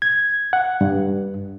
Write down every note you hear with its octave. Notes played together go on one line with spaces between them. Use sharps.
G#6
F#5
G2